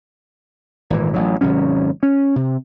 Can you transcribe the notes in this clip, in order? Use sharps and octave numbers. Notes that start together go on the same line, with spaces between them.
G#1 A#2 E3
A1 F#3
G#1 C3 F#3 C#4
C#4
C3